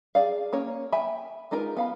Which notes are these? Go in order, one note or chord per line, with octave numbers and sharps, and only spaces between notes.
G#4 D5 F5
A#3 C#4 C#5
E5 G5 G#5 B5
G#3 D#4 F4 A#4 B4
B3 F5 B5